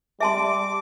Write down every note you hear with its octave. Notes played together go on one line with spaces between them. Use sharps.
G3 E5 A5 C6 D6